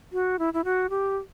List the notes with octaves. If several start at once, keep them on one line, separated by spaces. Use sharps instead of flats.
F#4
E4
E4
F#4
G4